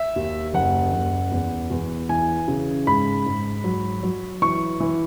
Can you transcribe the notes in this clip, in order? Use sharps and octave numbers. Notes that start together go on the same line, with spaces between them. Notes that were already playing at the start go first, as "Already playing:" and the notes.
Already playing: E5
D#2
F#1 F#5
F#1
E2
E2
E3 G#5
C#3
G#2 B5
G#2
F#3
F#3
E3 C#6
E3